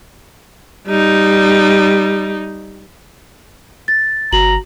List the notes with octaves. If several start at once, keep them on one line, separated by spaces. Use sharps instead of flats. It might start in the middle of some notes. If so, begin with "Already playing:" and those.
G3 D#4
A6
G1 F#4 A#5 F#7